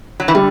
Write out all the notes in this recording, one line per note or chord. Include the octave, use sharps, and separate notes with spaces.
F#3
E3
D3 G3